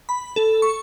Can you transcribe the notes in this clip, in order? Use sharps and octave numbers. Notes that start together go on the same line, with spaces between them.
B5
A4
C#6